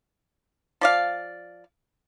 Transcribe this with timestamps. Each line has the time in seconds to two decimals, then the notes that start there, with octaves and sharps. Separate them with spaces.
0.81 F3 D5 F5